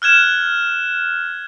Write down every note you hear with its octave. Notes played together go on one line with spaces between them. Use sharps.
F6 F#6 G#6 E7